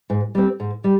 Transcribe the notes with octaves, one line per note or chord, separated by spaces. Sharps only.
G#2
G3 C4
G#2
G3